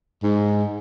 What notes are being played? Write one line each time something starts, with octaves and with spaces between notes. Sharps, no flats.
G#2